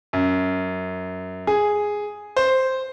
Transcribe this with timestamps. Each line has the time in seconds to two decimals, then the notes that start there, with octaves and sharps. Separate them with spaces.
0.13 F#2
1.47 G#4
2.36 C5